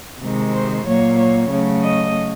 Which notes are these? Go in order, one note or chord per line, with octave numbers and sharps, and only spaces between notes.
C3 D#3 G#3
C5
A#2 F#3 A#3 C#5
C#5
C#3 F#3 A3
D#5